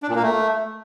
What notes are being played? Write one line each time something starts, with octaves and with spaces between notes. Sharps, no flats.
D4
A#2
A#3
A3